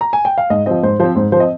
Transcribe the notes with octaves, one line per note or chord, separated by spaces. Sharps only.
A#5
G#5
G5
F5
G#2 D#5
F3 C4 D#5
G#2 C5
F3 C4 C5
G#2 C5
F3 C4 C5 D#5